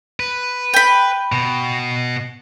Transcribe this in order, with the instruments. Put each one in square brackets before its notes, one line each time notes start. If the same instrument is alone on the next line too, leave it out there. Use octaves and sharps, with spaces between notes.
[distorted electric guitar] B4
[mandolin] G5 B5
[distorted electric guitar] B2